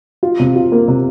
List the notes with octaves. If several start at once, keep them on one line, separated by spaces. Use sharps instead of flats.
F4
C3
F4
A#3
C3